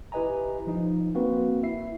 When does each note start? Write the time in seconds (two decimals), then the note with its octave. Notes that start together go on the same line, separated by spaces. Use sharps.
0.12 E4 G4 B4 D#5 G#5 A#5
0.67 F3 D#4
1.15 A#3 C4 F#4 B4
1.63 E4 E5 C7